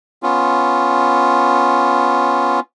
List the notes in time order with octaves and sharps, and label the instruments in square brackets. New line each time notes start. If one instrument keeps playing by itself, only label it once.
[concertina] B3 C#4 F4